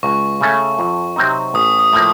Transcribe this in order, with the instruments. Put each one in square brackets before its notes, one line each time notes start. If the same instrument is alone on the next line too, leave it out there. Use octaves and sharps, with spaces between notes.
[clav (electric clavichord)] C#2 [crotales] C#6
[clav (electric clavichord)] C#3 A3 C#4 A4
F2
C3 F#3 C4 D#4
[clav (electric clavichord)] A1 [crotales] D#6
[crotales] D#6
[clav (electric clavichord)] A2 F3 A#3